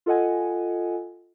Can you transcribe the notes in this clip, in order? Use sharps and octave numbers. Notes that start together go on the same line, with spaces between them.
F4 A4 D#5 F#5 G#5